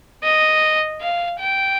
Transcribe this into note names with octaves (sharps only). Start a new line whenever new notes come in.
D#5
F5
G5